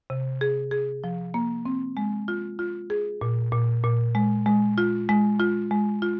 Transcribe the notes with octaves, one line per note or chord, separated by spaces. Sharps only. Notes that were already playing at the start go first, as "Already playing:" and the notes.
C3
G#4
G#4
F3
A#3
C4
G#3
F4
F4
G#4
A#2
A#2
A#2
G#3
G#3
F4
G#3
F4
G#3
F4